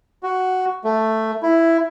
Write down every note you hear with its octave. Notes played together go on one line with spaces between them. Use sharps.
F#4
A3
E4